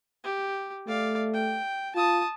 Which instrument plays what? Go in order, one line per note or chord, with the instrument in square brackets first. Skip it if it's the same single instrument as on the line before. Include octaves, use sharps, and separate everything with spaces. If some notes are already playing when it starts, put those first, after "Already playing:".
[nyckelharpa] G4
[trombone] A3 [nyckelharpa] D5 F5
[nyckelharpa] G5
[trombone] F4 [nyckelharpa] A5 D#6